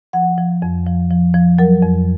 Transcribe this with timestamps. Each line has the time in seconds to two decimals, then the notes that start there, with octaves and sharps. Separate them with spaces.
0.13 F3 F#5
0.38 F3
0.62 F2
0.86 F3
1.11 F3
1.34 F3
1.59 F#3 A#4
1.83 F2